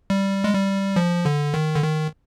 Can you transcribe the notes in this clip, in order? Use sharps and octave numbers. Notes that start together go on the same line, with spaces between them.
G3
G#3
G3
F3
D3
D#3
D3
D#3